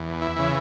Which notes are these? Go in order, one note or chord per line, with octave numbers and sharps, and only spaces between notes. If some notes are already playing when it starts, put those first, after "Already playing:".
Already playing: E2
E4
C#3 E3